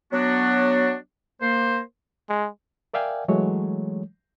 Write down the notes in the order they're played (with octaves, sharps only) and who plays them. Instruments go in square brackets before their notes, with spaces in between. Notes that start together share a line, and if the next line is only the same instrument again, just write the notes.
[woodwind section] F#3 B3 D4 F#4
A#3 C5
[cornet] G#3
[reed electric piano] A#4 D5 E5 F5 G5 G#5
E3 F#3 G#3 A3 C#5